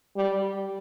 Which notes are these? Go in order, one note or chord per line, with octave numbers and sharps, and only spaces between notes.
G3